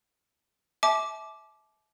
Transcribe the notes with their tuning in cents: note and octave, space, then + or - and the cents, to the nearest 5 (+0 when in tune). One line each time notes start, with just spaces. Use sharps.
E5 -20 A5 -40 D6 +0